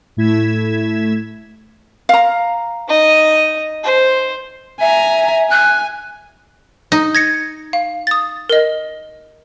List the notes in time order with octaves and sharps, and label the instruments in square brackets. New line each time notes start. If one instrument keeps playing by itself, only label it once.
[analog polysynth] A2 A3 E4 G#6 B6 E7
[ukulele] F5 A#5
[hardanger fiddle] D#4 D#5
C5
[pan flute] E5 [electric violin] G#5 A#5
[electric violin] G#5 [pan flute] F#6
[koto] D#4
[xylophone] G#6 A#6 C#7
F5
D#6 A6
A#4 D#5